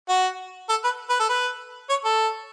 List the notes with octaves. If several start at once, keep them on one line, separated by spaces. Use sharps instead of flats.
F#4
A4
B4
B4
A4
B4
C#5
A4